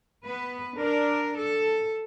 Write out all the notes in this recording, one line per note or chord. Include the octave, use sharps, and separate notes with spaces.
B3 B4
D4 A#4
A4